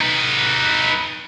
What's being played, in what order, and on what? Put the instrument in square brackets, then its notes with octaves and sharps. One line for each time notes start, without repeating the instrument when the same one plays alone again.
[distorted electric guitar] D#4 B4